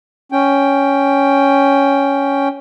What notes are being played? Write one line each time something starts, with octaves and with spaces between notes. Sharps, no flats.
C#4 G5